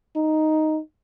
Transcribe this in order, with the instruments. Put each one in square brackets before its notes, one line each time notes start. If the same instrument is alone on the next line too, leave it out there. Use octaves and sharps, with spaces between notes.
[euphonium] D#4